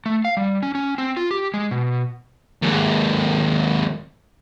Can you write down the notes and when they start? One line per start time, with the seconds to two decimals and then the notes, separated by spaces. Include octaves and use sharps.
0.06 A3
0.25 F5
0.37 G3
0.63 C#4
0.75 C#4
0.98 C4
1.17 F4
1.31 G4
1.54 G#3
1.71 B2
2.62 D#2 G#2